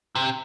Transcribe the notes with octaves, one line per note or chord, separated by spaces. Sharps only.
C3